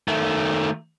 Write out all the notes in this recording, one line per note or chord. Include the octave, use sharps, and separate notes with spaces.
D#3 A3